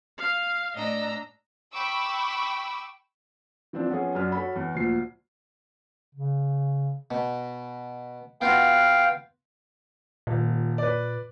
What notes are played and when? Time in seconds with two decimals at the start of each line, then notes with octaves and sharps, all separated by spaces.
0.18 F5
0.75 A2 D4 D#5 A#5 E6
1.73 G5 B5 C#6 D6 E6
3.73 E3 F3 C4 D4
3.90 F3 B3 C#4 F4 G#4
4.15 F#2 F#3 D4 F6
4.32 F#4 A4 C#5 B5
4.56 E2
4.74 D2 A#2 F3 C7
6.15 C#3
7.11 B2
8.41 B3 F4 F#4 F5 G5
10.27 D#1 A#2
10.78 B4 D5